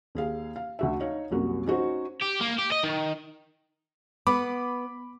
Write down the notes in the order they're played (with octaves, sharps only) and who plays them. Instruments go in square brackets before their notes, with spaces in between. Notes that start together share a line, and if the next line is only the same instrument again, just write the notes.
[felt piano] D#2 G#4 F5
F5
D2 F#4 E5
D#4 C#5 F5
C2 F#2 A#3 F#4
C#4 D#4 F#4 C5
[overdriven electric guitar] G4
A#3
G4
D#5
D#3
[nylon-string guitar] B3 [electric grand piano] B5 D6